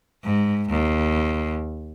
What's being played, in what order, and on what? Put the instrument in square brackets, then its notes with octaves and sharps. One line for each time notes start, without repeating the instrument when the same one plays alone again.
[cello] G#2
D#2